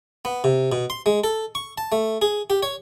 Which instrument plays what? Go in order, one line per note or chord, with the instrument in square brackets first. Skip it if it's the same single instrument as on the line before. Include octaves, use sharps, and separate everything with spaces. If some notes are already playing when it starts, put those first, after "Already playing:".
[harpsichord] B3
C3
B2
C6
G#3
A4
C#6
A5
A3
G#4
G4
C#5